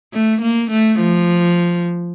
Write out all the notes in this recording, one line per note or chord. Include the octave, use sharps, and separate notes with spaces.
A3
A#3
A3
F3